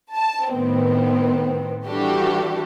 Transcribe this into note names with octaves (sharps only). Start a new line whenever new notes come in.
A5
A2 D#3 B3 C4
E3 G3 D4 F#4 G4 A4